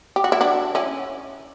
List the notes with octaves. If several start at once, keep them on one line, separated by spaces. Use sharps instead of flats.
G4
F#4
E4
D4 F#4
C#4 E4